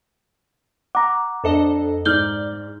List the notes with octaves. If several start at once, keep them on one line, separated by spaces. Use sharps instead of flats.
F#5 A#5 D6
F2 D4 A4 D#5
G#2 D5 F6 G6 G7